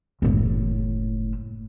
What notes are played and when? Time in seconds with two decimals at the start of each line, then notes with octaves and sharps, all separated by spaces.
0.22 F#1 A2